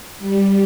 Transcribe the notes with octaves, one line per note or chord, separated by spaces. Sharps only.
G3